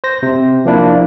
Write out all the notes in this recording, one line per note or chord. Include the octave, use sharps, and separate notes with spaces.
C5 A#6
C3
F3 A#3 D4 E4